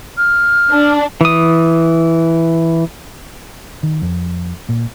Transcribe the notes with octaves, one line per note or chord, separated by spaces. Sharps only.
F6
D4
E3 D#6
D#3
F2
A#2